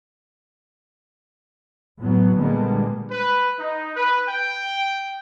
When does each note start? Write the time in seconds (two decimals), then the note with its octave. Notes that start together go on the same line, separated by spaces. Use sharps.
1.98 E2 A2 F#3 B3
2.34 A#2 D3 G3 G#3 A#3 B3
3.11 B4
3.59 D#4
3.95 B4
4.29 G5